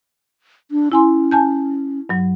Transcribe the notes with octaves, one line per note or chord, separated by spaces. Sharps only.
D4
C#4 E4 G#5 C6
G#5 A5 G6
G2 F#3